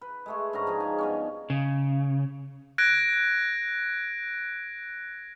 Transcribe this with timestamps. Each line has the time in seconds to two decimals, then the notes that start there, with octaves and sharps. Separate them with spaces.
0.01 B4
0.26 G#3 A3 G#4
0.53 G#2 D3 C#4 A#5
0.67 F3 D#4 G#4
0.80 G#5
0.98 G2 B3 C#4
1.50 C#3
2.78 F#6 G#6 A#6 D7